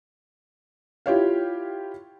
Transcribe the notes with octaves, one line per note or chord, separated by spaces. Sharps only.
E4 F4 G4 C#5 F5